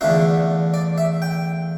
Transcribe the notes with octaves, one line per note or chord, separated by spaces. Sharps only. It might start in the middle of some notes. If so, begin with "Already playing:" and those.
E2 D3 A3 D4 F4 E5
D5
E5
G5